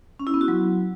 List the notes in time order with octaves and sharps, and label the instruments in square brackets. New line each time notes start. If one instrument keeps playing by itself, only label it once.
[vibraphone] C#4
E4
B3
F#4
F#3